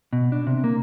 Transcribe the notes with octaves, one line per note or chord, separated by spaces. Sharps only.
B2
D4
C3
A#3